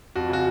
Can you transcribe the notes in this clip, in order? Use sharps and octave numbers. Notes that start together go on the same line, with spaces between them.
F2 F#4
C#3 F#4